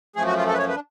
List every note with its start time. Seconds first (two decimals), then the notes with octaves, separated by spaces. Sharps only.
0.16 F#2 F3 A3 G#4
0.27 F#4
0.37 F4
0.47 A4
0.53 B4
0.58 C#5
0.68 B4
0.75 D4